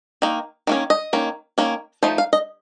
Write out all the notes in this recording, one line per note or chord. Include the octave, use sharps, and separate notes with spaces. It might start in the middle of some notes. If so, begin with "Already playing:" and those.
D#3 A#3
D#3 A#3 C#4
D#5
D#3 A#3 C#4
D#3 A#3 C#4
F3 A3 D#4 C5
F5
D#5